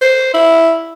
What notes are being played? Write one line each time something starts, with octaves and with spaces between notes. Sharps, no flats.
C5
E4